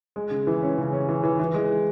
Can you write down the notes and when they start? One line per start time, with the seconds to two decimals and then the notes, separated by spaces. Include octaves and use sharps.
0.16 G#3
0.31 C#3
0.47 E3
0.62 C#4
0.78 C#3
0.93 C#4
1.09 E3
1.23 E3
1.39 E3
1.54 G#3